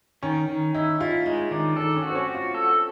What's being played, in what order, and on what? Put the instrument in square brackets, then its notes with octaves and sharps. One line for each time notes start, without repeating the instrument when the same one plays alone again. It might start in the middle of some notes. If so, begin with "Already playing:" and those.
[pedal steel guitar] D#3 [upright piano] C#4
[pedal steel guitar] D#3
[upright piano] D#4 [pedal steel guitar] E4
[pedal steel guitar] E4 [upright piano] F4
[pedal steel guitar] G#3 [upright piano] D#4
[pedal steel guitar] D#3 [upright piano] D4
[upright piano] D4 [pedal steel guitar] A4
[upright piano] C#4
[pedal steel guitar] F#4
[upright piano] C4
C#4
[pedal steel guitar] F#4
[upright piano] F4
[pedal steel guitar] A4